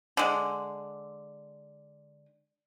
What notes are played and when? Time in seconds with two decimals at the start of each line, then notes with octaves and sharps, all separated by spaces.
0.17 D3 G#3